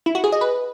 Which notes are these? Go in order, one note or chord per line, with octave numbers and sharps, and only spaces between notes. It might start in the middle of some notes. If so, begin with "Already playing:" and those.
E4
F#4
G#4
D#5
B4